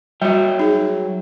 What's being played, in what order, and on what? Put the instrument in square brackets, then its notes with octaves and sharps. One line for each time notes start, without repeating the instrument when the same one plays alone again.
[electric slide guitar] F#3 E5 G5 [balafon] G3 F#4
[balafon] D#4 G#4